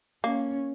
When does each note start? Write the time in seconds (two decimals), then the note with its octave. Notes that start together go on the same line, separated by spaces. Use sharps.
0.24 A#3 C#4